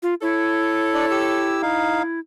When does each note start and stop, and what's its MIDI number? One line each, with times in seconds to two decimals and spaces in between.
0.03 0.14 65
0.22 2.20 64
0.22 1.67 69
0.22 1.67 73
0.94 1.06 62
0.94 1.06 74
1.11 1.62 67
1.11 1.62 88
1.62 2.02 63
1.62 2.02 77